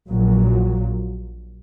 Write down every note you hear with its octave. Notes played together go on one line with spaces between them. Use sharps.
A#1 A#2 F#3